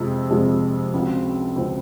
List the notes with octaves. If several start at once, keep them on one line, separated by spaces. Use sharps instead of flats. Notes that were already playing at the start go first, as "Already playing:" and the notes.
Already playing: F2 C3 F3 G#3
F2 C3 F3 G#3
C#2 C#3 F#3 C4 F4
C#2 C#3 F#3 C4 F4